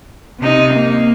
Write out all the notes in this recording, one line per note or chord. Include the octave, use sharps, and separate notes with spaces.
C3 D#4
A#3